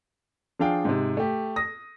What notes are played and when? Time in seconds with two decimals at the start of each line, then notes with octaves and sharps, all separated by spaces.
0.59 F3 D4 G#4 F5 G5
0.85 G#2 C3
1.17 A3 G4
1.56 D#6 A#6